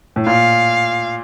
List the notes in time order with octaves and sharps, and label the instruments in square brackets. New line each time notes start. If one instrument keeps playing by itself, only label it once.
[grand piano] A2
[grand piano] A#2 [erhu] F5